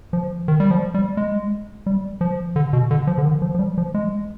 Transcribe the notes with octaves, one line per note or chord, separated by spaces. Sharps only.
F3
D#3
G3
F3
G3
G#3
G3
F3
D3
B2
D3
F3
D3
D#3
F3
F3
G3
F3
G#3